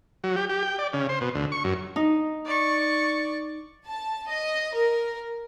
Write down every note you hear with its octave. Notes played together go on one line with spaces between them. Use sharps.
F#3
G4
G4
G5
D5
C#3
C5
B2
D2
C#6
F#2
D#4
D5 C#6
A5
D#5
A#4